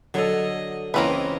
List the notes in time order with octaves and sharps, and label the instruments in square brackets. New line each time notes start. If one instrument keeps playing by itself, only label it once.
[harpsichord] D3 [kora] F#3 A4 [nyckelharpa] D#5
[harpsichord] C#2 C#4 [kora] E3 A#4 [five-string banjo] A#3 C4 B4 [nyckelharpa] D#5